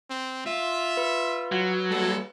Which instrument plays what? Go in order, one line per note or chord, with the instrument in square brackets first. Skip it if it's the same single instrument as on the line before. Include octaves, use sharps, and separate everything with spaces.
[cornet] C4
[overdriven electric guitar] F4 [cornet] E5
[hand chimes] B4
[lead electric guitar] F#3
[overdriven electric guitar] G3 A#3 [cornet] A4